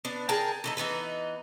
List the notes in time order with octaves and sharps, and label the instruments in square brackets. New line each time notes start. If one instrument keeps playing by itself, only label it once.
[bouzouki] B3 D4
G#4 A#4 G5 A5
E3 A3 D#4
E3 B3 D#4 B4